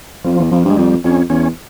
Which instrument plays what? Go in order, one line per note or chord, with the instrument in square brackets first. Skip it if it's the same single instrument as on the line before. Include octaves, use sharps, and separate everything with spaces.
[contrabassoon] F2 [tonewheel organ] F3
[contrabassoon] E2
[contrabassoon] F2 [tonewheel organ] F3
[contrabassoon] G2
[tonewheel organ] G#3
[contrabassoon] F2 [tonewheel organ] G3
[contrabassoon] F2 [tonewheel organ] C#4
[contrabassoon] E2 [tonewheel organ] C#4